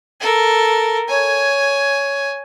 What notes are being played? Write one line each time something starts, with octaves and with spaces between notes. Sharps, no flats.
A4 A#4
C#5 G#5